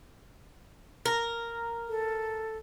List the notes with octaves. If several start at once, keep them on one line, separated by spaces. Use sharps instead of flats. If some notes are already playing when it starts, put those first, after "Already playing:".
A#4
A4